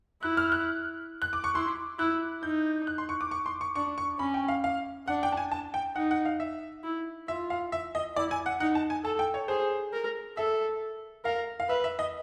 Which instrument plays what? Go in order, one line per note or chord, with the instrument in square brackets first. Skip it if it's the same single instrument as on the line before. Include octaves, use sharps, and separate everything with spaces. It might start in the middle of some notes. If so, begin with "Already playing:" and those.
[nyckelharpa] E4 [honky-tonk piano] F#6
[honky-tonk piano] F6
F#6
F#6
D6
C#6
[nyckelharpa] E4 [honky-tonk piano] C6
[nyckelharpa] E4 [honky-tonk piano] F#6
[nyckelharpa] D#4 [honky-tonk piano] G6
[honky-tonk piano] F#6
C6
C#6
D6
C#6
C6
C#6
[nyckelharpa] D4 [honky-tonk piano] C#6
[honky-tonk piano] C#6
[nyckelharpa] C#4 [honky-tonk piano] B5
[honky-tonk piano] G5
F5
F5
[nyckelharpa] D4 [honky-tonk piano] F#5
[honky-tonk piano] G5
A5
G#5
A5
G5
[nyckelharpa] D#4 [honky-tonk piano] F#5
[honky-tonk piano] F#5
F5
E5
[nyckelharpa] E4
[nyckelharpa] F4 [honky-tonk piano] E5
[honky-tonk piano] F5
E5
D#5
[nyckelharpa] E4 [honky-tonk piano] D5
[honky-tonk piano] G#5
F#5
[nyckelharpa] D#4 [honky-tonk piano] F#5
[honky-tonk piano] A5
G#5
[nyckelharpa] A4 [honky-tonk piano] A5
[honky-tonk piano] G5
C#5
[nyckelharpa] G#4 [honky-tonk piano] C5
[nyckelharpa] A#4
[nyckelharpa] A4 [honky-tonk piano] E5
[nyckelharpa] A#4 [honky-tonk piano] F5
[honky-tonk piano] F5
[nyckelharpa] B4 [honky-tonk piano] E5
[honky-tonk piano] E5
D#5